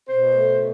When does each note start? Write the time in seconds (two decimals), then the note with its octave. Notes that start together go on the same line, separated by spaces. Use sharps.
0.09 B2 C5
0.34 A3
0.59 B2